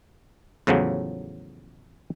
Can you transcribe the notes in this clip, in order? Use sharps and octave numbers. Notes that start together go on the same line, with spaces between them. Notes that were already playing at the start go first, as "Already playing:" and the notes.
E2 A2 C#3 F3 F#3